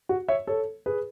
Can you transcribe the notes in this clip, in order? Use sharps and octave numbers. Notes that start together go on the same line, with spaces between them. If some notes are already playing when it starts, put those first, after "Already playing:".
F#4
C#5 E5
A4 C#5
G#4 B4